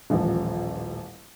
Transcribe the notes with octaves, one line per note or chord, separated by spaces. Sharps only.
D#1 A1 F3